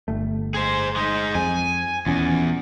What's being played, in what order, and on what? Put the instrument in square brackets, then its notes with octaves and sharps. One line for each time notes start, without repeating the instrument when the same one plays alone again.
[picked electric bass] G1 A3
[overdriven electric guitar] G#4 C5
G#3 D#4
[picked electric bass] F2 [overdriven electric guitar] G#5
[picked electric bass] D#1 C#4 [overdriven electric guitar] E2